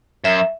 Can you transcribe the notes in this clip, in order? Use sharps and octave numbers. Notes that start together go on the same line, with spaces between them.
F#2 E5